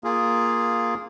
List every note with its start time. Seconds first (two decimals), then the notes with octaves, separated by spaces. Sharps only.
0.04 A#3 F4 G#4